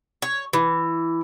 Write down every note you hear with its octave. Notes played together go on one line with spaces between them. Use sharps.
C#5
E3